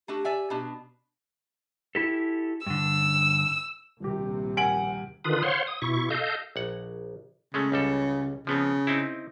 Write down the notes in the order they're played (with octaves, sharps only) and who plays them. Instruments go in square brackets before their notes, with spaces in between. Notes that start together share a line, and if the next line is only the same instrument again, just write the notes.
[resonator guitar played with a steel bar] A3 D4 F#4 [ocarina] G4
[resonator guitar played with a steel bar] D5 E5 G#5
B2 D4
[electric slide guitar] E4 G4 A4
[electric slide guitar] G2 D3 [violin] E6
[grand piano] D#1 G4 [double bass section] A#1 C3
[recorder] F#5 [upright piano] G#5 D7 F#7
[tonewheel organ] D3 D#3 F4 B4 D#6
C5 C#5 F5 F#5 C6
D#6
B2 E4 C#6
A4 D#5 F5 G6
[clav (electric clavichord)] A#1 F#5
[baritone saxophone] C#3 [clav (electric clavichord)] G#3 A3 C#4
[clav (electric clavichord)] C#2 G3 A4
[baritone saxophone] C#3 [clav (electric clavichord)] F3 B3 C4
[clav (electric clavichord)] C4 D#4 E4